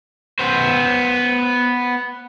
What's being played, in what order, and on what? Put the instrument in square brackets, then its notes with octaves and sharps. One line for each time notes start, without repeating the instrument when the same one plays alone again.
[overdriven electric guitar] B3 C5